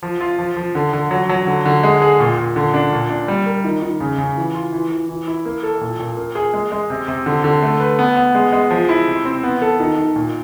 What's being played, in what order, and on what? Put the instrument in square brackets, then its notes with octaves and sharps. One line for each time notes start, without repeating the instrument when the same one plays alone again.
[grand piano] F3
F4
F3
F3
D3
D3
F#3
F#3
D3
D3
G#3
G#4
A#2
A#2
D3
D4
A#2
D4
G3
A#4
D#3
D#3
C#3
C#3
E3
F4
E3
E3
E3
E4
A#3
A4
A#2
A#2
A#3
G#4
G#3
G#3
C3
C3
D3
D3
A3
B4
B3
B3
G#3
G#3
F3
E4
C3
C4
B3
A4
D#3
D#3
A#2